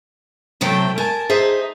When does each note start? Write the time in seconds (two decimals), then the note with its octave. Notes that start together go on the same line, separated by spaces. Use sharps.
0.61 A2 C3 F#3 A3 G5
0.98 A#4 G#5 A5
1.30 D#4 G#4 C5 E5